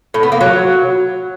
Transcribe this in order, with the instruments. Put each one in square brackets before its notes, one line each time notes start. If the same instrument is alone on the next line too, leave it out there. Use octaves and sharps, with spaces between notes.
[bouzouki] A2
B3
A#3
F#3